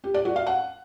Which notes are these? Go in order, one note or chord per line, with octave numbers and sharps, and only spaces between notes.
G4
D5
F#4
F5
F#5